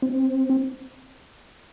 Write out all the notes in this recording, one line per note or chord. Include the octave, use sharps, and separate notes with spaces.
C4